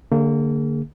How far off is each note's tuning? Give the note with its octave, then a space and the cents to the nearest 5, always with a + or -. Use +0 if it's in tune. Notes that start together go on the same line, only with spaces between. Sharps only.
D3 +0 A#3 -30 G#4 -10